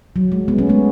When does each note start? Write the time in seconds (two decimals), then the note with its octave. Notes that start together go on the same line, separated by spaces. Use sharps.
0.16 F#3
0.32 G#3
0.48 G#3 B3
0.58 A3 C#4
0.69 G#3 B3